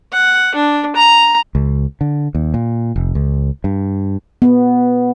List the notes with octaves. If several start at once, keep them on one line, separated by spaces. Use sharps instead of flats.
F#5
D4
A#5
C#2
D3
D#2
A#2
F1
C#2
G2
B3